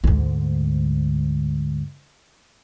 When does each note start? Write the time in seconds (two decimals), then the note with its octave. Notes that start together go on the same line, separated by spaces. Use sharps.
0.04 D2 G#2